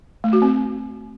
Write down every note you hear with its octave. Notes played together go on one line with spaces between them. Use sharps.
A3
F#4
C4